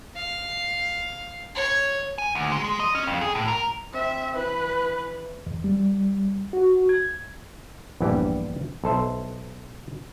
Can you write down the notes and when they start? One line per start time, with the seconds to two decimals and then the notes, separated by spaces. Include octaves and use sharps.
0.16 F5
1.55 C#5
2.18 G#5
2.35 D2
2.52 G#3
2.64 G#3
2.80 D#5
2.95 C#4
3.07 F2
3.21 G#4
3.35 A2
3.48 A#4
3.94 C4 E5
4.36 E3 B4
5.46 E2
5.64 G3
6.53 F#4
6.89 G#6
8.00 A#1 E2 G2 E3 G3 G4
8.84 B1 A4 C5 E5